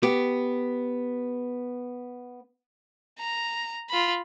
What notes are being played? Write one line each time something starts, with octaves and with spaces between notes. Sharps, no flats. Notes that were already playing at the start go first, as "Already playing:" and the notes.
B3 G4
A#5
F4 B5